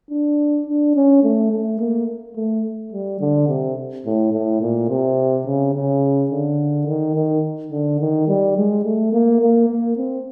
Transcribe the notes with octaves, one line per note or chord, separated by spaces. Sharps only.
D4
D4
C#4
A3
A3
A#3
A3
G3
D3
C3
A2
A2
A#2
C3
C#3
C#3
D3
D#3
D#3
D3
D#3
G3
G#3
A3
A#3
A#3
A#3
C4